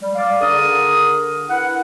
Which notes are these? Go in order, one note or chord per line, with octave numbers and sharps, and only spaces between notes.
G3
D5 F5
D3 D4 G#4 A#4 D#6
E4 A#4 B4 F#5